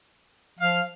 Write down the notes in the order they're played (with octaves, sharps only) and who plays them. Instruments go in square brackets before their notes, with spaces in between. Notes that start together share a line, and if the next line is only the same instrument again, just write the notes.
[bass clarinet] F3 [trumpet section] F5